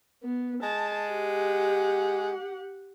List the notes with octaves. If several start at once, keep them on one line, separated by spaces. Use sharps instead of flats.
B3
G#3 A5
G4 F#5